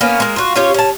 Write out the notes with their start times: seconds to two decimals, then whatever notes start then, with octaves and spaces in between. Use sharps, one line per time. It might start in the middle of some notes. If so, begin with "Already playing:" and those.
0.01 A#3 B3 C#4
0.20 G#3 A#3
0.36 F4 F#4
0.56 C#4 F4 G4 C#5
0.74 C#4 A5